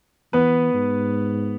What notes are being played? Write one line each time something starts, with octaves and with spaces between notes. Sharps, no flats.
E3 B3 B4
G#2